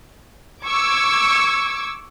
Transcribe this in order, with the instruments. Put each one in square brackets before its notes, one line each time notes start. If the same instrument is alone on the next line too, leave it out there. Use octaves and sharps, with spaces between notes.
[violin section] C#6 D6 E6 G#6